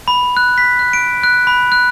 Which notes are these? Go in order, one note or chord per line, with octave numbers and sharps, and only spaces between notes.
B5
F#6
B6
F#6
D7
F#6
B5
F#6